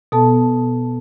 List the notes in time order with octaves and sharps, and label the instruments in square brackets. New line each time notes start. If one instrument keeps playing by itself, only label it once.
[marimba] B2 B3 A4 A5